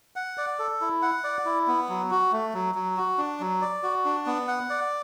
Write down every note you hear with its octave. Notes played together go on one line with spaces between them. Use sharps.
F#5
D5
A4
E4
F#5
D5
E4
B3
F#3
F#4
A3
F#3
F#3
F#4
D4
F#3
D5
F#4
D4
B3
F#5
D5